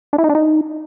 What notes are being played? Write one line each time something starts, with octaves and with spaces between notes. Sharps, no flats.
D4
E4
D#4
D4
D#4